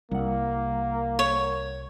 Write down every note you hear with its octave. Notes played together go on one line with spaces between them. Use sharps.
C2 G3 A#3 F#5
C#5